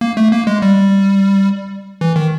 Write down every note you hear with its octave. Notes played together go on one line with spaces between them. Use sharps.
A#3
A3
A#3
G#3
G3
E3
D#3